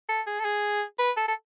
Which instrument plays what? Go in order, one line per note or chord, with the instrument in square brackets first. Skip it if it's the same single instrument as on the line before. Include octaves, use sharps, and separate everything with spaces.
[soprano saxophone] A4
G#4
A4
G#4
B4
A4
A4